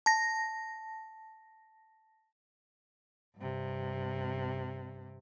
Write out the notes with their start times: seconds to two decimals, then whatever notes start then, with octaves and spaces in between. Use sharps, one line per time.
0.06 A5 A#6
3.36 G2 C3